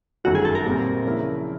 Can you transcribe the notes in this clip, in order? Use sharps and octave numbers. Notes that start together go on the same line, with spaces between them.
G1 F#2 D#3 F#3 A3 F#4
G#4
A4
A#4
A#2 G3 C4
C#3 F3 A#3 C#4 E4